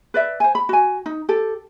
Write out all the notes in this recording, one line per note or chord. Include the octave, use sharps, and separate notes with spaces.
B4 D5 E5
C5 G#5
B5
F#4 G#5
D#4
G4 A4